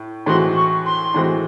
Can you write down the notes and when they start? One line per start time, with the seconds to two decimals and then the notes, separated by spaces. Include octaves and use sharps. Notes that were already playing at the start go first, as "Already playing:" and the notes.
Already playing: A2
0.26 A2 E3 G#3 C4 F#4 C6
0.56 C#6
0.85 C6
1.14 A2 E3 G#3 C4 F#4